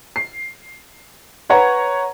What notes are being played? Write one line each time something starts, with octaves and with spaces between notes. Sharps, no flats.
C7
B4 C#5 F#5 A#5